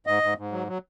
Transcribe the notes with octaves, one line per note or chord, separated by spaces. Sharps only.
G#2 D#5
G#2
G#2
F#3
F#3